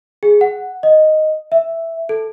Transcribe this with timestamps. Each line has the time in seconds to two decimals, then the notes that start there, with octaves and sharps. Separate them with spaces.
0.23 G#4
0.41 F#5
0.83 D#5
1.52 E5
2.09 A4